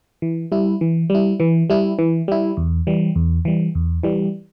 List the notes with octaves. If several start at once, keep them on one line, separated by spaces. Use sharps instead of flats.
E3
G3 E4
E3
G3 E4
E3
G3 E4
E3
G3 E4
E2
E3 G3
E2
E3 G3
E2
E3 G3